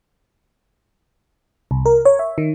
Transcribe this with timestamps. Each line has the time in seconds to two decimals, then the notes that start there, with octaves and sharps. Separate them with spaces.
1.71 C2
1.86 A#4
2.05 C#5
2.19 E5
2.38 D#3